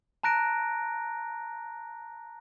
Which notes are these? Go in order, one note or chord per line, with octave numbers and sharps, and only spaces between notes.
A5 A#5 F#6 A#6 D7